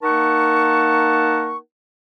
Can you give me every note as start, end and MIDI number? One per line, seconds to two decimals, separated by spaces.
0.03 1.57 58
0.03 1.57 63
0.03 1.57 70
0.03 1.57 78
0.03 1.57 81
0.03 1.57 85